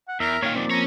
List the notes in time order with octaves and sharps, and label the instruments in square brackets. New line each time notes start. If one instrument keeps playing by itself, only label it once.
[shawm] F#5
[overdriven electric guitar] E2 [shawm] A#4 [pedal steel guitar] E5
[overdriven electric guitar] A#2 D#3 [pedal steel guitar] C#5 F5
[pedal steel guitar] F3 A#3 C4 [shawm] D5
[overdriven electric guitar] C#4 C#5 [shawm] A#5